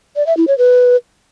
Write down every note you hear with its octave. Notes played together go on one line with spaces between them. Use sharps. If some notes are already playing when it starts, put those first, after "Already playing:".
D5
E5
E4
C#5
B4